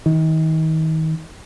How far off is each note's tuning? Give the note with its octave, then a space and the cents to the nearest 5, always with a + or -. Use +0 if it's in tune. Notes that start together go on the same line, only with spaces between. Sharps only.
D#3 +35